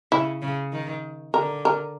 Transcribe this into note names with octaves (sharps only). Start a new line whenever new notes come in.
C#3 E4
C#3
D#3
D3 A#4
A#4